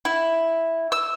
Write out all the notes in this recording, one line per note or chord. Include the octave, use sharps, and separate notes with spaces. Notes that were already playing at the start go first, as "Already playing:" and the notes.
E4
E6